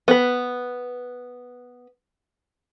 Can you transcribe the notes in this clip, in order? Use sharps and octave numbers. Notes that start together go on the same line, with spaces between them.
B3 B4